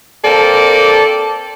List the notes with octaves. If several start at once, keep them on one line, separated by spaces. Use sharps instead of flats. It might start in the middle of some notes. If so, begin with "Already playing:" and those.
A#3 C4 A4 D5